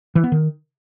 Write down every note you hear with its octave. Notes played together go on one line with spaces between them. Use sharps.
E3
B3
D#3